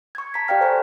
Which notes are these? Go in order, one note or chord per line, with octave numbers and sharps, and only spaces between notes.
C#6 G#6
A5 A#5 B6
G4 D5 F5 G5 F6
A4 C5 G#5 A#5